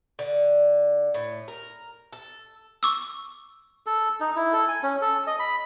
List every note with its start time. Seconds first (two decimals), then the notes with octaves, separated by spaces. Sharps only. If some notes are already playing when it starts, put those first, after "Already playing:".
0.19 D3
1.14 A2
1.48 A#4
2.13 A4
2.83 C#6 D6 E6
3.86 A4
4.20 D#4
4.36 E4
4.53 A4
4.68 G#5
4.83 C#4
5.01 A4
5.27 D#5
5.39 B5